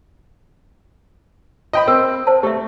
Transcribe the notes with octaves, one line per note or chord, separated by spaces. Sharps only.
D#5 G5 B5
C4 A#4 E6
C5 A5
A3 G4 E5